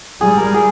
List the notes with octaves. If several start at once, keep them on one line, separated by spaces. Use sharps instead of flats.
G3 G#4
A#4
G#4